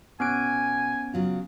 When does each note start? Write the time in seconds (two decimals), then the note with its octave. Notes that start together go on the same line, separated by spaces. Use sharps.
0.20 B2 B3 C#4 G#5 D7
1.14 C#3 F#3 F4